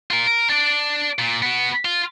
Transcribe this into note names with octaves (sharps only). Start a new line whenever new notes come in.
F4 A#4
A#4
D4 D5
A#2
B3 F#4
F4